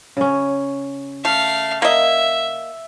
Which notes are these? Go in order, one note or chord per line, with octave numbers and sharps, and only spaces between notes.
C#3 C#4
A3 F5
A#3 D#5 E5